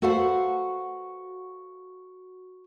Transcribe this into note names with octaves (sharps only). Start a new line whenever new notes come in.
F#4 A4 B4 C5 F5 F#5